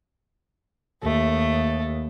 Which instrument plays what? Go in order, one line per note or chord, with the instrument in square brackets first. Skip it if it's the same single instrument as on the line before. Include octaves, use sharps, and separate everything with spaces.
[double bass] D#2 [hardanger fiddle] A3